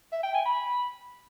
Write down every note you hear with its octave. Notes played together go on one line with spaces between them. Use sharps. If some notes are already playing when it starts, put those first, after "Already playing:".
E5
G5
G#5
B5